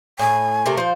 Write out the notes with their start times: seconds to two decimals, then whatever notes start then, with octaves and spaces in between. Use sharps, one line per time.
0.19 A2 G#5
0.66 C3 A3 A#4
0.77 F3 C5